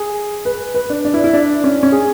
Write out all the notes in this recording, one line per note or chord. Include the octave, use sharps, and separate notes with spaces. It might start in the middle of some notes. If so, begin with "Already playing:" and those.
Already playing: G#4
B4
B4
D4
D4
E4
E4
D4
C#4
C#4
G#4